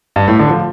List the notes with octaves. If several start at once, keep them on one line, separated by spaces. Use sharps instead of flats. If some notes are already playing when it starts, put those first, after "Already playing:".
G2
A2
D3
F3